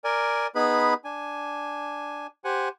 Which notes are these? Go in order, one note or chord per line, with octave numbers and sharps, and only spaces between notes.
A#4 D5 G#5
B3 D#4 G#4 B4 B5
D4 G#5
G4 C5 F#5 G#5